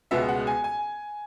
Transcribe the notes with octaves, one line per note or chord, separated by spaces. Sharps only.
C#2 B2 G#3 B3 E5
F#5
G#5
G#5